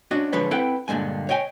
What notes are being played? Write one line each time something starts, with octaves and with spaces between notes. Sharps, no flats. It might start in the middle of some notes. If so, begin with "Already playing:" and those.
C#4 D4 F#4 D#5
D3 F3 G#3 B4 C#5
C4 E4 A4 B4 F#5 G5
G2 A#2 D3 G#3 G#5
C#5 D#5 G5 G#5